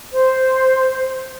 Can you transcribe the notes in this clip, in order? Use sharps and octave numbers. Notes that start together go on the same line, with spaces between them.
C5